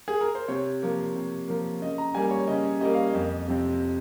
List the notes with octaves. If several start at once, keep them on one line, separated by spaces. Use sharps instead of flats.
G#4
A#4
C5
C3 C#5
F3 A#3
C3
F3 A#3
C#3 D#5
A#5
G3 A#3 G#5
C#5
C#3 D#5
G3 A#3 D#5
F5
D#5
F2
C3 F3 C4